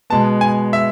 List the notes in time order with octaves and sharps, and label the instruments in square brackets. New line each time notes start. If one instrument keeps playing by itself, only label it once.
[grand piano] B2 G#3 B3 [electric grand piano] A5
[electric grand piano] G#5
E5